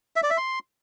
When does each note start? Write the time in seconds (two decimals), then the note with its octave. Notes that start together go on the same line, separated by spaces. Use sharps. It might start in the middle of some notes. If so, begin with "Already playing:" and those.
0.16 E5
0.23 D5
0.30 E5
0.37 C6